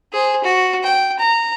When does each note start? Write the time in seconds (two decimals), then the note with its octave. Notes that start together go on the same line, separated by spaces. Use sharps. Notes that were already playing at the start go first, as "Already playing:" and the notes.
0.12 G#4 C5
0.44 F#4
0.83 G5
1.19 A#5